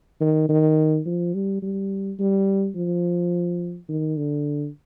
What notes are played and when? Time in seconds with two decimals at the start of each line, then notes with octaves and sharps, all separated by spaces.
0.20 D#3
0.49 D#3
1.06 F3
1.34 G3
1.62 G3
2.19 G3
2.76 F3
3.89 D#3
4.17 D3